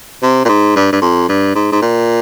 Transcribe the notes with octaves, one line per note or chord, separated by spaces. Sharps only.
C3
A#2
G#2
G2
G2
F2
G2
G#2
G#2
A#2